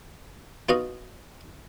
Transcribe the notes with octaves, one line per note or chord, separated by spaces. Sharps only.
B3 D#4 F4 F#4 D#5 F5